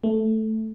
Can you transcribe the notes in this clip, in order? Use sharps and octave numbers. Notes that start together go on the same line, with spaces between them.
A3